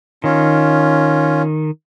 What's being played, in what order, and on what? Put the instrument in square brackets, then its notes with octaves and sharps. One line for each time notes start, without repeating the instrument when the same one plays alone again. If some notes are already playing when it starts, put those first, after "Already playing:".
[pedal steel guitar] D#3 [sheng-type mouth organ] C#4 F4